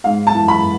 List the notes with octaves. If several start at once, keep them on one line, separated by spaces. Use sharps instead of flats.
G#2 F5
A5
E3
B5